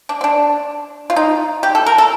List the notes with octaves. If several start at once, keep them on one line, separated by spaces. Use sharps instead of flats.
D4
C4
D4
F4
D#4
G4
A4
A#4
A4